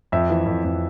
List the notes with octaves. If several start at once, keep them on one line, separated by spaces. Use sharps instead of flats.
F2 E5
E3
F2
F2